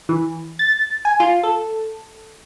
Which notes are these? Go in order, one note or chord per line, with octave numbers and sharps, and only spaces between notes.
E3
A6
G#5
F4
A4